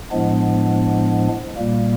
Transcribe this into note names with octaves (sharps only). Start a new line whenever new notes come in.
A2 F3 G#3 B3 D4
A#2 G3 A#3